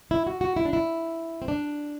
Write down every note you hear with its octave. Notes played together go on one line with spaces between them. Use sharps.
E4
F#4
F#4
E4
D4
E4
C4
D4